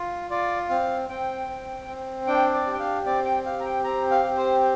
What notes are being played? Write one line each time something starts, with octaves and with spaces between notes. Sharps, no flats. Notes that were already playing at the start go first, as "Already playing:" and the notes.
Already playing: F4
F4 D5
C4 F5
C4 G5
C4
C4
D4 G5
D5
G4
G5
F5
C4 D5
G5
G4 F5
A#5
G5
C4 A#5
F5
G4
C5